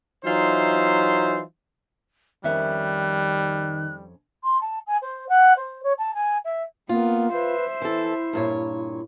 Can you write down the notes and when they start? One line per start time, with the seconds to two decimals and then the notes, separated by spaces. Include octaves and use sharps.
0.25 E3 F#3 D#4 F4 C5 E5
2.44 F2 D#3 G3 C#4 E5 F#6
4.43 C6
4.61 A5
4.87 G#5
5.02 C5
5.29 F#5
5.57 C5
5.83 C#5
5.98 A5
6.14 G#5
6.44 E5
6.89 A#3 B3 F4
7.33 B4 C5 E5
7.82 E3 E4 A4
8.33 G2 A#2 C#5